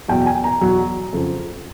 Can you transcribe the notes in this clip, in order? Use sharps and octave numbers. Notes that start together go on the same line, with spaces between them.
E2 B2 F#3 G5
G#5
A#5
E2 B2 F#3
F2 C#3 F3